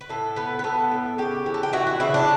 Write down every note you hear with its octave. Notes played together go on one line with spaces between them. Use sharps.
B4
A2 A4
B3 B4
B4
B3 A4
A2
C#3 G4
E3
A4
G4
E3 F#4
F#4
C#3 E4
D4